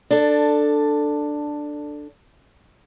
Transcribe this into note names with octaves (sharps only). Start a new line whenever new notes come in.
D4 A4